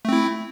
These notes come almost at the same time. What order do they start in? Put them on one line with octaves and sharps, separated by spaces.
A3 C4 E4